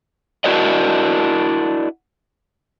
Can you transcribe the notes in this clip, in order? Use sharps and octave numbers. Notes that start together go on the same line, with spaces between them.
D4 E4 F#4 A#4 D5 D#5